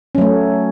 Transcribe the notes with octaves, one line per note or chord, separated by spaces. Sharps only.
F#3 A3 C#4